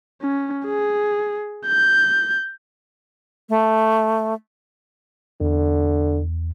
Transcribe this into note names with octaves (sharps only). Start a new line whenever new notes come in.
C#4
G#4
G6
A3
E2 D3